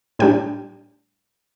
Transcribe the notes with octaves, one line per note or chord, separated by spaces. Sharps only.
A2 G3 D4 G5